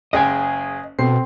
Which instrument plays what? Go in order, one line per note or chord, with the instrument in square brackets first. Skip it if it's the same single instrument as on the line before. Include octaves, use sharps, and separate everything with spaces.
[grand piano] F#1 G#4 G5 [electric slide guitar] D#5 G#5 [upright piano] D#6
[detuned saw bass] B2 [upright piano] C4 A4 [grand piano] C7